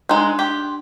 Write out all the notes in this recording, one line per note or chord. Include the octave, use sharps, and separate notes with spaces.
G#3 D4 D#4 C6 F#6
G4